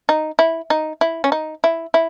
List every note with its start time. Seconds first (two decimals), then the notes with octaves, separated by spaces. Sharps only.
0.09 D#4
0.39 E4
0.70 D#4
1.01 E4
1.24 C#4
1.32 D#4
1.64 E4
1.94 E4